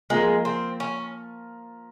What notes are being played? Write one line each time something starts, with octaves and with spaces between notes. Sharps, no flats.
F3 G#3 A#3 F4 A#4
C4
C#4